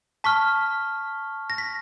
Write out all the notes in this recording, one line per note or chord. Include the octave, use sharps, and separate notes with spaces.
A5 C#6 F6 B6
A#6
B6